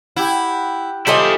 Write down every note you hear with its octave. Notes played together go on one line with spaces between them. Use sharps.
E4 G4 F#5
G3 E4 F4 G#4 A4 C5 D#5 F5